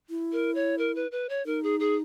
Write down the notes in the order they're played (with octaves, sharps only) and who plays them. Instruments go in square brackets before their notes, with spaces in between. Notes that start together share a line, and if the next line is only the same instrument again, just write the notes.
[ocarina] E4
[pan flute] A#4
C#5
A#4
B4
B4
C#5
[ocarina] D#4 [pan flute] A#4
[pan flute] G#4
G#4